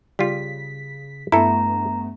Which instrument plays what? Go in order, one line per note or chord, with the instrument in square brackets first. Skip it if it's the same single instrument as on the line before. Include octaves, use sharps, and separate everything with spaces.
[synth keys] C#3 B6 [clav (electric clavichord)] G3 F4
[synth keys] G2 A3 B3 [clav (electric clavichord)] E4 A4 [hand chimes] A#5